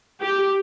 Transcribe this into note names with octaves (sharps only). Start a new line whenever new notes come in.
G4